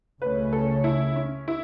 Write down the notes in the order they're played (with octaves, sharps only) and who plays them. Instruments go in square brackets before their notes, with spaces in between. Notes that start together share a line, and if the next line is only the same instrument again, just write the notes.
[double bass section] C#2 C#3 A3 C#4 [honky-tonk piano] B4
[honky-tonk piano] A4
E4
C#4
E4